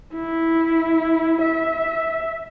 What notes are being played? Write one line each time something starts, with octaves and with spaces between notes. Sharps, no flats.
E4
E5